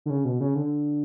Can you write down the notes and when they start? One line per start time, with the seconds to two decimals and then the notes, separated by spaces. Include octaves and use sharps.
0.06 D3
0.10 C#3
0.25 B2
0.40 C#3
0.55 D3